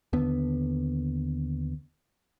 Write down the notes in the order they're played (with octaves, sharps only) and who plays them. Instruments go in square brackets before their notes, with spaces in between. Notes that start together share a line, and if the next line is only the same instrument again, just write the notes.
[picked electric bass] D#2 D3 B3